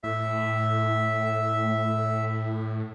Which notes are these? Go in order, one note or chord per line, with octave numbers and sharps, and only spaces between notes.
A2 E5